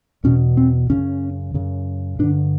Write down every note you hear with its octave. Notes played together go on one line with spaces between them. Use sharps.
E2 B2 C#4
C4
F#2 C#3 C#4
F#2 C#3
G2 D3 D4